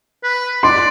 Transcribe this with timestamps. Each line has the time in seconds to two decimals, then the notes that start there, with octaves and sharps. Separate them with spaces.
0.24 B4
0.63 D5 C6